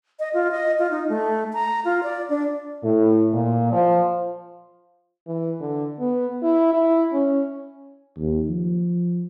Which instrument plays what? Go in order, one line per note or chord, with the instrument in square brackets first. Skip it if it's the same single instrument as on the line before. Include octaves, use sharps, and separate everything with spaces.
[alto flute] D#5
F4
D#5
F4
D#4
A3
A#5
F4
D5
D4
[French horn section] A2
A#2
F3
[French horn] E3
D3
B3
E4
E4
C#4
[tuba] D#2
F3